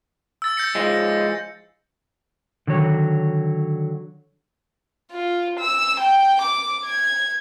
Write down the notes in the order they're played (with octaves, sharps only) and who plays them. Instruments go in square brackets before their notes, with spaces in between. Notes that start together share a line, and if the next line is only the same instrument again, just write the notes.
[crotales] E6 A6
G6 A#6 C#7
[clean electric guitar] F3 G#3
[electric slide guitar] D3 D#3 F#3 C#5
[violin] F4
E6
G5
D6
G#6